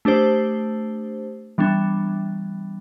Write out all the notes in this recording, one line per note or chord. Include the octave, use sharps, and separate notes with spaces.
A3 D4 G4 C5
E3 G3 B3 D4